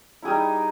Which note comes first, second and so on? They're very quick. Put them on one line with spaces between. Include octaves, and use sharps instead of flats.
E4 G#4 G3 D#4